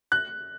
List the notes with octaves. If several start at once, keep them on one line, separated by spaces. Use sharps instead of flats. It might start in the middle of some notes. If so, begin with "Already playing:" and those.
F#6